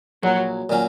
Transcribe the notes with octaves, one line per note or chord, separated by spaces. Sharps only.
A#1 F#3
A#2 F#3 C#4